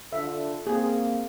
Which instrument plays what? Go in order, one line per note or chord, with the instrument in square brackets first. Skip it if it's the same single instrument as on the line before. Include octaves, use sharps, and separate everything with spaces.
[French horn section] D3 F4 A4 [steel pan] E5
[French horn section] A#3 C4 [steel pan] G#4